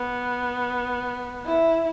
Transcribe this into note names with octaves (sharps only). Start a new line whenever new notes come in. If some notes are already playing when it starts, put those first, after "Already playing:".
Already playing: B3
E4